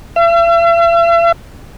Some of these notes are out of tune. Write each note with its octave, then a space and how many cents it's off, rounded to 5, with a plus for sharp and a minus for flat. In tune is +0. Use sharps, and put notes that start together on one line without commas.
E5 +45